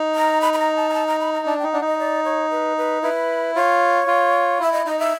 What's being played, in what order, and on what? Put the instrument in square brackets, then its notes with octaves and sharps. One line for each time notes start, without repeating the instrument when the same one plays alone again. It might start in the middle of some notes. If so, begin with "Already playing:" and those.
Already playing: [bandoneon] D#4
[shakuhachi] A#5
B5
B5
A#5
A5
A#5
A5
A#5
B5
A#5
[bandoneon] D4 [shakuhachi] A5
[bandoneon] D#4 [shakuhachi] G5
[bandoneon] D4 [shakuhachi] F#5
[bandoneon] D#4 [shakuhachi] D#5
[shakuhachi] D5
C#5
B4
B4
[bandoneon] E4 [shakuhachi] B4
[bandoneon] F4 [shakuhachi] C#5
[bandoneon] F4
[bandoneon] E4 [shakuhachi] E5
[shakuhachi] D#5
[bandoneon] D#4 [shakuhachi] D#5
[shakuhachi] E5